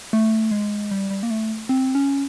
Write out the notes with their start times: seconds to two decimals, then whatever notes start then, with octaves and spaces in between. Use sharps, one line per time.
0.13 A3
0.51 G#3
0.91 G3
1.11 G3
1.23 A#3
1.30 A3
1.69 C4
1.95 C#4